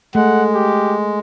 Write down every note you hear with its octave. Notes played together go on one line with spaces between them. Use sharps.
G#3 A3 F#5
G4